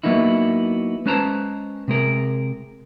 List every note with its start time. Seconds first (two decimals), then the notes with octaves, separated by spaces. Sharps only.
0.04 F#3 A#3 B3 D#4 E4
1.06 G#3 C#4 B4 C5 A5 A#5
1.88 C3 G#3 A#4